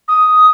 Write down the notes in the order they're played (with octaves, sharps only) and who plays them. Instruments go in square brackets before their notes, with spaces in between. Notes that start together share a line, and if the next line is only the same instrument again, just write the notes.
[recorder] D#6